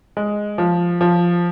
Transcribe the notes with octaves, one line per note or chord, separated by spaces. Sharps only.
G#3
F3
F3